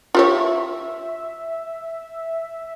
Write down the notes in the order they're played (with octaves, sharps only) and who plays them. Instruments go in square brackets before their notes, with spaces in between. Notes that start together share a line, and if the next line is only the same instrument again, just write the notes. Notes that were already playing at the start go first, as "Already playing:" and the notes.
[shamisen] F4 G4 C#5 [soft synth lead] E5